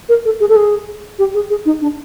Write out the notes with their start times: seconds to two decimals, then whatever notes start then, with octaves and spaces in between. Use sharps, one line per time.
0.09 A#4
0.25 A4
0.40 G#4
0.49 A4
0.56 G#4
1.19 G4
1.34 G#4
1.50 G#4
1.66 D#4
1.82 D4